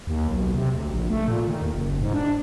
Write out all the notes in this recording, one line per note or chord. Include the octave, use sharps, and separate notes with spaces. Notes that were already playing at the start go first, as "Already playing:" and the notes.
D#2
B1
C3
D2
A#1
A3
A#2
D#3
D#2
F#1
G#2
D4